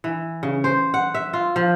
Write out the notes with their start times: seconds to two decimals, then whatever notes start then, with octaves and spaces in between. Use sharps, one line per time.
0.04 E3
0.43 C#3
0.64 C5
0.94 F#5
1.14 E5
1.33 F4
1.56 F3